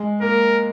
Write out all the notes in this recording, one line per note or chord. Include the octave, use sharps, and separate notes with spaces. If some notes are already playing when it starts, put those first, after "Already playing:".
Already playing: G#3
A#3 A#4